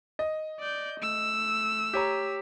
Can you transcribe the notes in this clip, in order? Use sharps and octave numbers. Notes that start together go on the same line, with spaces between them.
D#5
D5 G6
A3 E6
G4 C#5 A#5